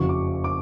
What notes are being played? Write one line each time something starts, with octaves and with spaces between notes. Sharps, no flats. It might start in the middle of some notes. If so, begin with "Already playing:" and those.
Already playing: F#1 F2 C#3 F#3 C#6
D6
D6